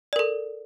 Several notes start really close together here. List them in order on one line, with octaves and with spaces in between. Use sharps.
D5 A#4 A4